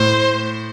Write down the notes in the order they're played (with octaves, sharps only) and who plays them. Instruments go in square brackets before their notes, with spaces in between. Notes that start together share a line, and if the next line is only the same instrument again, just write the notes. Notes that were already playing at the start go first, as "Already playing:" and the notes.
Already playing: [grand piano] A2 [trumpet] C5